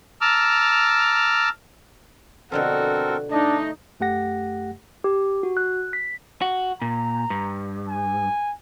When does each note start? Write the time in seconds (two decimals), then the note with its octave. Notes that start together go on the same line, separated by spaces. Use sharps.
0.21 A5 A#5 D6 E6 F6
2.52 B2 D3 F3 C4 F#4 A4 A#4
3.31 A3 D4 D#4 D#5
4.00 F#2 A3 G4 F#5 A#6
5.04 G4
5.43 F#4
5.57 F#6
5.93 B6
6.41 F#4
6.82 A#2 A#5
7.30 G2
7.89 G#5